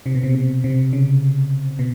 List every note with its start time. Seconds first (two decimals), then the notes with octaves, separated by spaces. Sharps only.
0.06 C3
0.15 B2
0.23 C3
0.35 C3
0.64 C3
0.93 C#3
1.79 B2